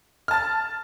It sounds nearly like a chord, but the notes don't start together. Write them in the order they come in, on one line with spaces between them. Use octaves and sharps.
F6 A5 A6